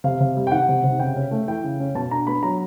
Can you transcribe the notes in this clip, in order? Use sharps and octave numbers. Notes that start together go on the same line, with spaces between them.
C3 F5
C3
G3
G5
D#3 F#5
C3
C3
C#3 G5
C#4
A3
E3 G5
C#3
C#4
B2 A5
D4 A#5
B3 B5
F#3 A#5